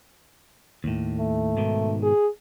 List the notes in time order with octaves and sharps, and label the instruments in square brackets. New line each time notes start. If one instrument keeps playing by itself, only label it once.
[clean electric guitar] D#2 A2
[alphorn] A3
[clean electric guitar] G#2 B2 D#3
[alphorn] G#4